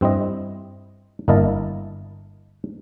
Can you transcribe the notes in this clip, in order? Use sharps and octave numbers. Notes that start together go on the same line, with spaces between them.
G2 C4 E4 D#5
G1 A#3 E4 A#4 D#5 A5